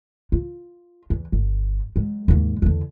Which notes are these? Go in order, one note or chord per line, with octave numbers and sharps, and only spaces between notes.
F4
E2
G1
F#3 G#3
D#2 G#2
E2 D3